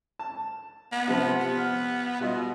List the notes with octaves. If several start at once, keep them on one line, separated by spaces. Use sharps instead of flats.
A5
B3
C3 F3 C4
B3
F6
B2 G3 F4 D#5